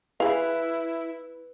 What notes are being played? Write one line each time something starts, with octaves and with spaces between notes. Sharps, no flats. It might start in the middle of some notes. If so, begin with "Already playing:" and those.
E4 G#4 B4 F5